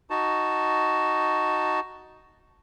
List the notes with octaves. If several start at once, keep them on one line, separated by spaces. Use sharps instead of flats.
D#4 F#4 A5